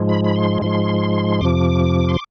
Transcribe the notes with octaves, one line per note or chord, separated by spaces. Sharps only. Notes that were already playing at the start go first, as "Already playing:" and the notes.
Already playing: G#2 F3 G#3
B5
B5
C6
G#2 F3 G#3 C6
F2 C3 F3 D6
C6